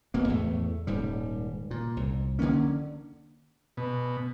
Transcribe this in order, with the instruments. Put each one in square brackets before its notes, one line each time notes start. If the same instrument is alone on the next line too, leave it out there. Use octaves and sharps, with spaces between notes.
[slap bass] B1 B2 A#3
E2 A2 A3
D#1 G#2 G3
A#2
C2
D3 F3 A#3 C#4
[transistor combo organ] B2